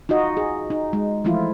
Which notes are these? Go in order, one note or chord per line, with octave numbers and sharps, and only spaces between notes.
D#4 F4 F#4 D#5
G#4
D#4
G#3
E3 F3 A3 E4 F4